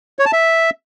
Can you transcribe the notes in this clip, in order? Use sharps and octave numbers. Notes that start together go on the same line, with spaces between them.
C#5
A5
E5